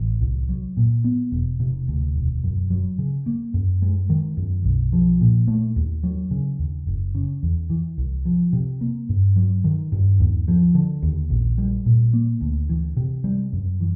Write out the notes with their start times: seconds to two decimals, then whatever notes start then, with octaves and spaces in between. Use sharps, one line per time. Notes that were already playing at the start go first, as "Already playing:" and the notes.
Already playing: A1
0.21 C2
0.49 F#3
0.77 A#2
1.04 B3
1.32 E1
1.60 C3
1.88 D2
2.15 E1
2.44 F#2
2.70 F#3
2.98 C#3
3.26 A#3
3.54 F#2
3.82 G#3
4.09 D#3
4.37 F#2
4.64 B1
4.93 F3
5.21 A#2
5.48 A3
5.76 D#2
6.03 F#3
6.31 C#3
6.59 D#2
6.87 F#1
7.15 C#3
7.43 E2
7.70 E3
7.98 C2
8.25 F3
8.53 C3
8.81 A#3
9.09 G2
9.36 F#3
9.64 D#3
9.92 G2
10.20 D#2
10.48 F3
10.75 D3
11.02 D#2
11.30 A#1
11.58 G3
11.86 A#2
12.13 A#3
12.41 D2
12.69 E3
12.97 C3
13.24 G3
13.53 F#2
13.80 E3